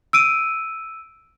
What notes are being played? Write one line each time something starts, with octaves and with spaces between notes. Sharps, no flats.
E6 D7 D#7